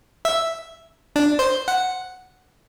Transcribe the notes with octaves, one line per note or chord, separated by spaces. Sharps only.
E5
D4
C5
F#5